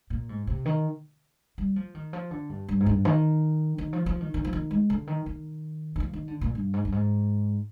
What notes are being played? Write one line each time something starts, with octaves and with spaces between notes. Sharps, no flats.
A#2
G#2
C3
D#3
G3
F3
D#3
F3
D3
G2
G2
G#2
G2
D#3
D#3
F3
F3
D#3
D#3
F3
D#3
G#3
D3
D#3
D#3
D#3
F3
D#3
D3
A#2
G2
G#2
G2
G#2